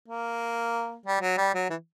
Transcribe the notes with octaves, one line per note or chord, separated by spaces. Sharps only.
A#3
G3
F#3
G3
F#3
E3